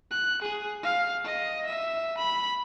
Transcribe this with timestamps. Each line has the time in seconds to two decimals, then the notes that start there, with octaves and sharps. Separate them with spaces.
0.11 F#6
0.42 G#4
0.83 F5
1.25 D#5
1.66 E5
2.18 B5